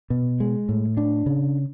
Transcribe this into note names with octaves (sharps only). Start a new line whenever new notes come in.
B2
G#3
A2
D4
C#3